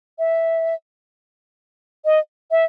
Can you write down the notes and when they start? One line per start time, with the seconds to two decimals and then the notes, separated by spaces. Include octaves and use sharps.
0.19 E5
2.05 D#5
2.51 E5